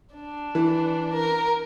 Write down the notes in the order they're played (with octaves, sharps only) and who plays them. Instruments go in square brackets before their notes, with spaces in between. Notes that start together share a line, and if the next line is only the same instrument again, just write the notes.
[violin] D4
[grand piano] E3
[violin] A#4